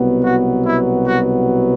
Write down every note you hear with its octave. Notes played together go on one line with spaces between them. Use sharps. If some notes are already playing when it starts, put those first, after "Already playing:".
Already playing: C2 B2 F#3 B3
F#4
E4
F#4